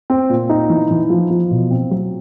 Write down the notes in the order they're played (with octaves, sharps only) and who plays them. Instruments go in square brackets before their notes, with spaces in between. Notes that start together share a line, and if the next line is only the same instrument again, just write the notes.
[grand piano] C4
A#2
D#4
E3
E3
F3
F3
B2
C4
F#3